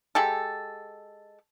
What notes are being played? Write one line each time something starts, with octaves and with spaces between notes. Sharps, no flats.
G#3 G4 A4